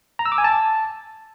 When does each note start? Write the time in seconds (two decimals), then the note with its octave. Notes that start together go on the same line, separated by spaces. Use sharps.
0.19 A#5
0.26 E6
0.32 D6
0.38 G#5
0.44 A5